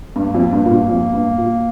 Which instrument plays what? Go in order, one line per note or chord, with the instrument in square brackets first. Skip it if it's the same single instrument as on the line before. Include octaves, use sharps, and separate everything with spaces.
[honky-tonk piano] G2 [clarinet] A#3
[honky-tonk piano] F2
G2
A#2
G2
F2
G2
A#2